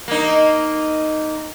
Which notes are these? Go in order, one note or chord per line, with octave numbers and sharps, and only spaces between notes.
A#3 D#4